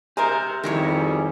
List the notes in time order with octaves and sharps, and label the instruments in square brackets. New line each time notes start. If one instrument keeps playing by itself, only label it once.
[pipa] G#3 A#4 C5 [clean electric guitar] G4 E5
[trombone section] F2 G3 G#4 [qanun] D#3 E4 C#5